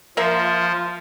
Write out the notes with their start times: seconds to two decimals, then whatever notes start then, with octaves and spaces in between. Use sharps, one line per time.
0.17 F3 A#3 F4 E5